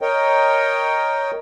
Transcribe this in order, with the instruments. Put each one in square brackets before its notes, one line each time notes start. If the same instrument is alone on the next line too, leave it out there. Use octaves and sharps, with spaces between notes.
[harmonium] A#4 C#5 D#5 G5